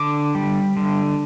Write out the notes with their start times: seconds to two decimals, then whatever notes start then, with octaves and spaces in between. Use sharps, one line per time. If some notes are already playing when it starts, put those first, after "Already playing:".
Already playing: D3 D6
0.35 G3
0.77 D3